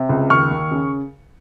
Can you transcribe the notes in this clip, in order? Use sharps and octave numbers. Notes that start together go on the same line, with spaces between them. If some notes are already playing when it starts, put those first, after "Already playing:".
Already playing: C3
C#2
D#2 C#6 F6
D#2
C#3